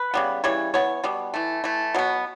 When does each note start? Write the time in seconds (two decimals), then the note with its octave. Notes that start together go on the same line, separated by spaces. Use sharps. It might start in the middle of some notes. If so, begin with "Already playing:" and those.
Already playing: B4
0.14 C#3 G3 B3
0.44 C#3 E3 G3 C#5
0.74 E3 B3 C#5
1.04 B2 G3 B3
1.34 E3 A3
1.64 E3 A3
1.94 B2 F#3 B3